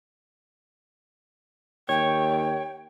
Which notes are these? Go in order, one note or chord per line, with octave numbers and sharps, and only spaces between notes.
D#2 C#5 G5